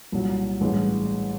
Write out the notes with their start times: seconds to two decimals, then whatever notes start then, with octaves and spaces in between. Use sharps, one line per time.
0.12 C2 A#2 F#3
0.61 A1 G2 E3 G#3